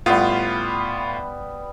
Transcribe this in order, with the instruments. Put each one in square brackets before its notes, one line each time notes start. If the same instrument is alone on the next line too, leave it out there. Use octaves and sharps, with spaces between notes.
[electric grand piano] A2 F4 [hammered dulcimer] G3 B3